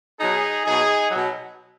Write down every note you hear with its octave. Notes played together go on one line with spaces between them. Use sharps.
B2 F#3 D#4 G#4
B2 F#3 D#4 G#4
B2 F#3